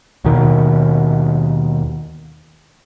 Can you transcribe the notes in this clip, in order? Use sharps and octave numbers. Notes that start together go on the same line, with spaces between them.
D#2 B2 D#3